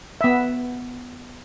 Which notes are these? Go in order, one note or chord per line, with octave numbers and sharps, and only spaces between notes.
B3 E5